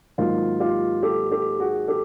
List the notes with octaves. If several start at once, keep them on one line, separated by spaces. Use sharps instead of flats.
G#2 D#3 F#3 A#3 F4
F4 G4
G4 A4
G4 A4
F#4 G#4
G4 A4